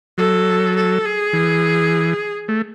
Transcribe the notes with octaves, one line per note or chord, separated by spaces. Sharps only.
F#3 A4
A4
G#4
E3
A3